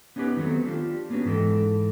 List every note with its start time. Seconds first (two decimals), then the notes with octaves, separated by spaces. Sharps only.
0.16 B3 C#4 D#4 F4 G4 B4
0.37 D#3 F#3 A3 B3 C4
0.65 D4 F4 G4
1.10 A#3 B3 C#4 D4 F#4 G4
1.25 G#2 E3 A4 D#5 G5